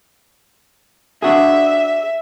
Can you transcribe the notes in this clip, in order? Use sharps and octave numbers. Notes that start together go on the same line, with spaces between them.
D4 F#4 G#4 E5